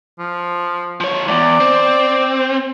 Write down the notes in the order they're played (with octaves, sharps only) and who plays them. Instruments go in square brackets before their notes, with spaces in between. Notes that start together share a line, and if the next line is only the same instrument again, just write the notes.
[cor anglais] F3
[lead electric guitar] F3 C#5
[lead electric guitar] E2 G2 [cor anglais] D5
[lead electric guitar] C4